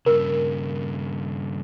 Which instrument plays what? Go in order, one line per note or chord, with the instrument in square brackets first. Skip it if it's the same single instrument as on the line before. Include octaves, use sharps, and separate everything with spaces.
[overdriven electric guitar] G2 C#3 [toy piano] A#4